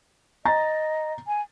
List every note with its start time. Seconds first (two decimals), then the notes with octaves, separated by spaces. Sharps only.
0.45 D#5 A#5 A6
1.27 G#5